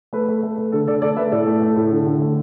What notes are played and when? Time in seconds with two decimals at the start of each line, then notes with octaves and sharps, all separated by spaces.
0.13 A3 B4
0.29 A3
0.43 A3
0.58 A3
0.72 D3 A4
0.87 D3 A4 D5
1.02 A3 A4 D5
1.17 A3 B4 E5
1.32 A2 A4 D5
1.47 A3
1.62 A3
1.76 A2
1.92 D3
2.06 D3
2.22 A3